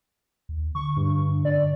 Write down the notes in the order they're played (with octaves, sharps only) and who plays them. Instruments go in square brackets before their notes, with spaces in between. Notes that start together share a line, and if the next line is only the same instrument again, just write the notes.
[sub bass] D#2
[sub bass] D3 [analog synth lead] C#6
[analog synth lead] G2
D5